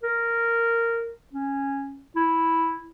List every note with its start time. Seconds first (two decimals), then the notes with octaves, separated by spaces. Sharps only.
0.03 A#4
1.33 C#4
2.16 E4